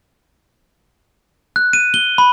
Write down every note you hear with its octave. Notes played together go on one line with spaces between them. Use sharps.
F#6
D#7
G7
B5